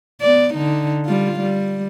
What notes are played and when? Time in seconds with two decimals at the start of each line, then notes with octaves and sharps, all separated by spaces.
0.22 B3 D5
0.54 D3 D#4
1.06 G3 F4
1.39 G3